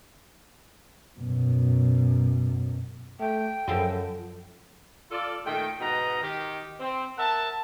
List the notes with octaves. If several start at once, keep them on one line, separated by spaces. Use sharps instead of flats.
F#2 B2
A3 G5
F#2 C#3 F3 A4 D#5
F4 A4 D5
A#2 D#3 A3 G5
G#2 B2 B3 D#4 D#5 A#5
D#3 G4
C4
A#4 E5 F#5 A5